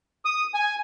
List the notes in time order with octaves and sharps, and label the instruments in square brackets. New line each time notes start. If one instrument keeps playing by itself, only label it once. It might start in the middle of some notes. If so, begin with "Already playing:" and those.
[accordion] D#6
G#5